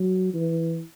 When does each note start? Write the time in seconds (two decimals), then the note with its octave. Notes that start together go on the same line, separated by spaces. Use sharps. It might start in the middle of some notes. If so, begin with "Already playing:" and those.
Already playing: F#3
0.34 E3